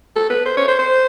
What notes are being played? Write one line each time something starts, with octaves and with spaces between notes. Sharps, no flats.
A4
B4
C5
C#5
C5
C5